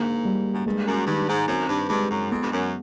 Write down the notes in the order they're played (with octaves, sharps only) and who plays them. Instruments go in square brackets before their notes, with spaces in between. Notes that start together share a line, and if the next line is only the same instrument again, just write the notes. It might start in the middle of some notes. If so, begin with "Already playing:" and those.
Already playing: [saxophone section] G#2 [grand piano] D3 A#3
[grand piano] G3
[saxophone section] F#2
[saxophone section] G2 [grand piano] G#3
[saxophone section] F#2
[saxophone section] G2 [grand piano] D#3
[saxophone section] G#2
[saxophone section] F#2 [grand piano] C4
[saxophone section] G2
[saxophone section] G2 [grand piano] G#3
[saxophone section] F#2
[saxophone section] F2 [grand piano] B3
[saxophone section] G2
F#2